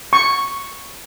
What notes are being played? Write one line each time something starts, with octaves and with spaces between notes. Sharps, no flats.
C#6